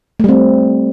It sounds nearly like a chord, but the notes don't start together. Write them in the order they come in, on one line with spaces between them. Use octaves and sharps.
A3 G3 C4